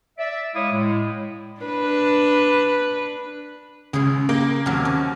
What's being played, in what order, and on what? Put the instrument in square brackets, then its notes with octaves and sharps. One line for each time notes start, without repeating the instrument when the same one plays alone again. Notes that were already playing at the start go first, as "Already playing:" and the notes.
[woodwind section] D5 E5
G#3 E4 C#5 F5 D6 D#6
A2 G#3
[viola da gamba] D4 B4
[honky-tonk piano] C#2 [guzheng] C#3 G#4
[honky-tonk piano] A#3 [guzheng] G5
[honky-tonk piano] D#2 F6 [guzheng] C3 F#3
[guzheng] C#4